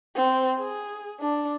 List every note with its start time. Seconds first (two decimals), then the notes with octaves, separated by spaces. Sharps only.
0.16 C4
0.60 G#4
1.20 D4